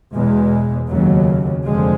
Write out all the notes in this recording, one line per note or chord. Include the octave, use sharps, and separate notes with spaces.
E2 B2 G#3
F1 D#2 C#3 F#3
F1 F2 D3 F3 G#3